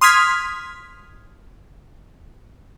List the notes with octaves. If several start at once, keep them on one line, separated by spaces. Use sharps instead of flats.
C6 D#6 F6 G#6 B6